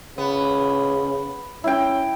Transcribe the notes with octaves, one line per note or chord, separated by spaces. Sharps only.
C#3 B3
C#4 E4 G5